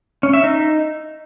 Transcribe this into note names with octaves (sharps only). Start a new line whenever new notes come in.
C#4
E5
D#4